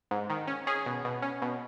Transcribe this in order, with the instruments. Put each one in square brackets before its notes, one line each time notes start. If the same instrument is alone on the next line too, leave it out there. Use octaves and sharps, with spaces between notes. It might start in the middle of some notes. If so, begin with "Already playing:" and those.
[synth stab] G#2
D#3
C#4
C#4 G#4
B2
B2
C#4
B2